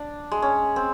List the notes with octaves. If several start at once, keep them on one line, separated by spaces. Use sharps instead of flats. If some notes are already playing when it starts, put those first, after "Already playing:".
Already playing: D4
G#3
C#4
C4